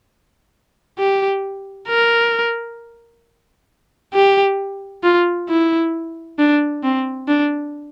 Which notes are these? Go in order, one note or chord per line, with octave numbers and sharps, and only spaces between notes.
G4
A#4
G4
F4
E4
D4
C4
D4